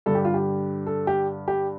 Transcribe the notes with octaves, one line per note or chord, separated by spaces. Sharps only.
G2 D3 A4
G4
F4
G4
A4
G4
G4